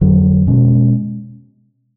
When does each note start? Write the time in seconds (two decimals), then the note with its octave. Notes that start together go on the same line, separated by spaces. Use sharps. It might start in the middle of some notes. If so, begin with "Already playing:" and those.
0.01 F2 D3 F#3
0.47 B2 G#3 C#4